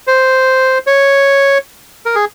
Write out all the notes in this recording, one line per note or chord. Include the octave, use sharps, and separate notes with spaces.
C5
C#5
A#4
G#4